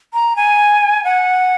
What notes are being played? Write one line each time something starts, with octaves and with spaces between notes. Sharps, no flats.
A#5
G#5
F#5